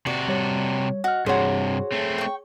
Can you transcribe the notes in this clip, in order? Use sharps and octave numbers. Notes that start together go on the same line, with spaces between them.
C3 F#4 D5
G3 C#5
F#4 D#5 F6
G2 C3 F#4 G#4 C5 C#5
A3 C4
G5 C#6